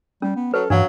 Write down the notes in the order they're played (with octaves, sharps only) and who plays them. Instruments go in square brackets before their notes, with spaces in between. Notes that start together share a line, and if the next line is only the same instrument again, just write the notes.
[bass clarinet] G3 [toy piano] C#4
[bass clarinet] B3
[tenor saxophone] F#3 [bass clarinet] A4 [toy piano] B4
[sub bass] G2 [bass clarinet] E3 [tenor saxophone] F#3 [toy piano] D4 F5